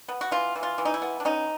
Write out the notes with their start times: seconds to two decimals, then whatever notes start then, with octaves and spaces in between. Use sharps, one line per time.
0.08 B3
0.21 F#4
0.31 E3 F4
0.56 E3
0.63 F4
0.78 E3
0.85 D#4
0.94 E4
1.02 B3
1.20 D4
1.25 C#4 D#4